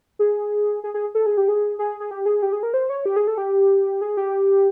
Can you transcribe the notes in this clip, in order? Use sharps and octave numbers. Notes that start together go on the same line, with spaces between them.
G#4
G#4
G#4
A4
G#4
G4
G#4
G#4
G#4
G4
G#4
G4
G#4
A#4
C5
C#5
G4
G#4
A4
G4
G#4
G4